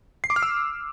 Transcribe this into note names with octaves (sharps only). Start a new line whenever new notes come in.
C7
D6
F6
E6